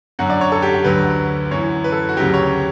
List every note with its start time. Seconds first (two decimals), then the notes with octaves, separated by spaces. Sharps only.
0.19 F#2 D3 F#3 F#5
0.30 D5
0.41 C#5
0.52 A4
0.62 G4
0.75 G4
0.84 D2 D3 F#3 B4
1.51 F#2 E3 C#5
1.84 B4
1.92 A4
2.09 F#4
2.17 D2 C#3 F#3 G4
2.34 C#5